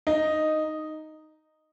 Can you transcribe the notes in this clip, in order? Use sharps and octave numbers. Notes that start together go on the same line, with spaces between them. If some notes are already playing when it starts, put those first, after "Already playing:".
D#4